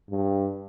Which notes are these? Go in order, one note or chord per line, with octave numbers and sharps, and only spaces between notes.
G2